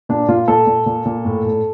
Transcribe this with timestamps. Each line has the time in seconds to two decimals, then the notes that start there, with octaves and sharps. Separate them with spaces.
0.09 A#2 D4
0.28 A#2 F4
0.48 A#2 A4
0.67 A#2
0.86 A#2
1.06 A#2
1.25 A2
1.44 A2